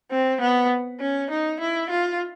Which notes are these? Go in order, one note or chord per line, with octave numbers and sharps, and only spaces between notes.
C4
B3
C#4
D#4
E4
F4